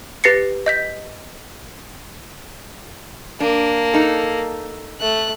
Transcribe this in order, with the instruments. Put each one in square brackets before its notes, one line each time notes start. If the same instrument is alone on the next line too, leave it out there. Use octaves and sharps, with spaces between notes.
[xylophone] G4 B4 A6 A#6 C7 C#7
D#5 G6 B6
[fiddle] A#3 [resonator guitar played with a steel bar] D4
[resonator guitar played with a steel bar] D#4 A4
[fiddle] A3 F#6